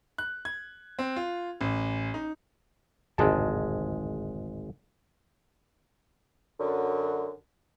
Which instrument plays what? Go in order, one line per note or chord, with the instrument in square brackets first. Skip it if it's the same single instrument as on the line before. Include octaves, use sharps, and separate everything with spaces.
[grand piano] F#6
G#6
C4
F4
A1
D#4
[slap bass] D1 F2 C3 [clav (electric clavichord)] G#1 G#3 A5
[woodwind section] F#2 D3